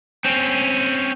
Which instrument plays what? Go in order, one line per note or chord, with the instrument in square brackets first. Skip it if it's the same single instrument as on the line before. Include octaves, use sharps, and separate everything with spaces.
[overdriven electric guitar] C4 C#4